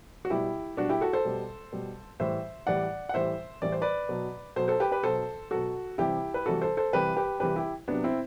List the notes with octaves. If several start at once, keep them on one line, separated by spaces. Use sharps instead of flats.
F#4
B2 G3 E4 G4
B2 G3 D4 F#4
E4 G4
F#4 A4
A4 C5
B2 G3
B2 G3
A2 E3 G3 C5 E5
A2 E3 G3 D5 F#5
F#5
A2 E3 G3 C5 E5
A2 E3 G3 D5
C5
B4 D5
B2 F#3
B2 F#3 A4 C5
A4 C5
G4 B4
G4 B4
B2 F#3 A4 C5
B2 F#3 F#4 A4
C3 E3 G3 E4 G4
B4
C3 E3 G3 F#4 A4
A4 C5
A4 C5
C3 E3 G3 G4 B4
G4 B4
C3 E3 G3 G4 B4
E4 G4
C3 F#3 B3 D4
C4 E4